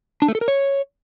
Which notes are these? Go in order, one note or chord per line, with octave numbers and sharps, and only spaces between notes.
D4
A3
A4
A#4
C#5